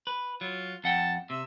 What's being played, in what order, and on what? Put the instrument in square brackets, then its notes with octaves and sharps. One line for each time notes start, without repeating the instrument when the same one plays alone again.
[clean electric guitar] B4
[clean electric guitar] F#3 [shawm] F4
[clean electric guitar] F2 F#5 G5 [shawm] A5
[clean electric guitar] C3 [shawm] E5